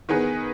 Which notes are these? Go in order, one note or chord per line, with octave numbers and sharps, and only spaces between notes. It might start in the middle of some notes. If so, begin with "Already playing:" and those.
D#3 B3 D#4 G#4 B4